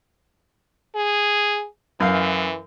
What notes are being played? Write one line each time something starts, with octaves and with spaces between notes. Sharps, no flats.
G#4
F#2 E3 F5